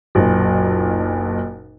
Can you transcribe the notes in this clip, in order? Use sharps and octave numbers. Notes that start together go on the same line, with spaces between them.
F#1 B1 A#2